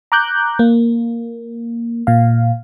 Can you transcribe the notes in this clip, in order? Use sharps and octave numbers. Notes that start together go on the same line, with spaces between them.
A#5 D6 F#6 G6
A#3
A#2 F5